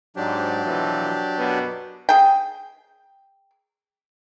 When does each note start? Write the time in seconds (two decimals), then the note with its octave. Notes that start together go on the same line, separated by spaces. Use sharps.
0.16 G#2 F#3 D4 G4
0.65 B2 E3 F3
1.38 F#2 B2 B3
2.09 G#4 G5